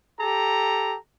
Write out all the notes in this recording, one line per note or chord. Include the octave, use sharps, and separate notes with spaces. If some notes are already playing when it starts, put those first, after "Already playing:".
G4 A4 A#5